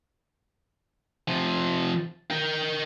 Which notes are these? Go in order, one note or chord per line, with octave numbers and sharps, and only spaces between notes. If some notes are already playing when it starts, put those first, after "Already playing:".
C3 F3
A#4 G5